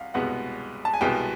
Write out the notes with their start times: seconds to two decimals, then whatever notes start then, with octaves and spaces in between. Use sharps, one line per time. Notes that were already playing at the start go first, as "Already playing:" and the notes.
Already playing: C2 F5 F#5
0.14 C2 B2 G#3 B3 F#5
0.85 A5
0.94 G#5
1.01 C2 B2 G#3 B3 G5